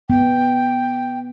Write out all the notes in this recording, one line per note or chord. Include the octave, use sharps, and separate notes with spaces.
B3 G5